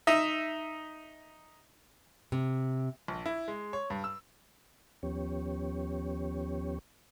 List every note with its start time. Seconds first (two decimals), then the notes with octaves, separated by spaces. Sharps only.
0.07 D#4 E5
2.32 C3
3.08 A#1
3.26 E4
3.48 G#3
3.73 C#5
3.90 G2
4.04 E6
5.03 D#2 F3 B3 C#4 G4 C#5